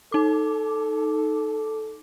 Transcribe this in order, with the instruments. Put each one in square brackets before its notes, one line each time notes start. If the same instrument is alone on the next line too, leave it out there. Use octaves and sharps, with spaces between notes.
[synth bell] D#4 D6 [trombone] A4